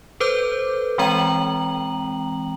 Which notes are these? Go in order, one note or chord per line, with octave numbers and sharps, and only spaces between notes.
A4 B4 C5 D6 G6
E3 G#3 C4 G5 A#5 F#7